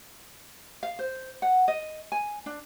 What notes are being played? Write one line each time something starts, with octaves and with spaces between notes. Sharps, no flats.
F5
C5
F#5
D#5
G#5
D4